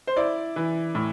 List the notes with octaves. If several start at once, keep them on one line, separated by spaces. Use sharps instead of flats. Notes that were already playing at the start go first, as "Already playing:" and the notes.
C5
E4 D5
E3
A2